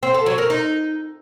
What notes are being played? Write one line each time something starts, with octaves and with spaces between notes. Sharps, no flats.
C4
A4
F#3
A#4
D#4